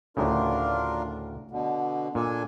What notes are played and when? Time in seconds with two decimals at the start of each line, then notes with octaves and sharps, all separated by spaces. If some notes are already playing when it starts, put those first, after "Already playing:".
0.17 D2 A2 C#3 D4 F4 A#4
1.51 B2 D3
2.15 A#2 D4 A4 G#5